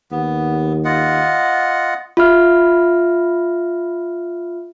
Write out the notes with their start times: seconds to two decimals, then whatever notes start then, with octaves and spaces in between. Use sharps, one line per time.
0.11 D#2 B3
0.85 F4 D#5 F#5
2.17 F4 E5 F6